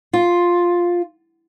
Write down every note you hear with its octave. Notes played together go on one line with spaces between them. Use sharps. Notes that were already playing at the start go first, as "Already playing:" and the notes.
F4